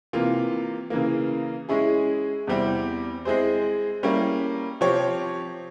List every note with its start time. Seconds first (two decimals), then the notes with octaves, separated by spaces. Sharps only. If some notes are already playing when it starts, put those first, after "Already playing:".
0.13 C3 E3 A#3 F4
0.90 C#3 E3 A#3
1.69 G#3 C#4 E4 G#4
2.47 E2 C3 G3 C4 E4
3.25 G#3 C4 E4 G#4 C5
4.03 G3 A#3 C#4 E4
4.81 C3 F3 C4 G4 C#5